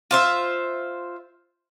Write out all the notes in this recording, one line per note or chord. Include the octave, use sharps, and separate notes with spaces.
F4 C5 E5